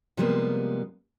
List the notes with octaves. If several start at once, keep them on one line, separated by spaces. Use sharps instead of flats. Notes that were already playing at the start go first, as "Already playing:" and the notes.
C3 F3 G3 G#3 A#3 B3